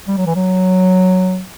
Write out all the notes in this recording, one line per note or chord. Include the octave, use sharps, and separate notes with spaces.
G3
F#3
E3
F#3